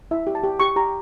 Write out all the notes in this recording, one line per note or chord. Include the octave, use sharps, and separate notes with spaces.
E4 E5
G4
A5
G4
G4 C#6
G4 A#5